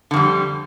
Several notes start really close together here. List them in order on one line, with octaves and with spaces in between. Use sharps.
D3 F2 G3